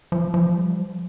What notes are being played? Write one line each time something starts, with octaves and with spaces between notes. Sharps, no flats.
F3
F3
G3
F3